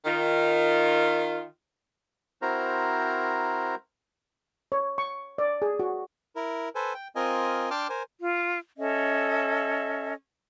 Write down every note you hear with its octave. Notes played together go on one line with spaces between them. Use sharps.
D#3 F4
C4 E4 F#4 A#4 C5 A#5
C#5
C#6
D5
G#4
F#4
E4 A#4
A4 B4 C5 G#5
G5
C4 F4 A#4 D#5 G#5
D4 G5 A5 C6 D6 F6
A#4 C5 G#5
F4
C#4 A4 D#5 E5